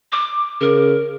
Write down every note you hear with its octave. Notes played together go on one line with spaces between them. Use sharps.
D6
C#3 A#4